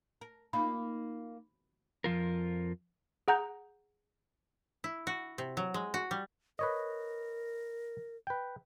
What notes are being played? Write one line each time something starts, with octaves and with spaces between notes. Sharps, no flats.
A#4
A#3 D#4 F4 B5
F2 F3 F4 A#4
G#4 F#5 A#5 G6
E4
F#4
C3
F#3
G#3
F#4
G3
A#4 B4 C#5 D#5
B4 G5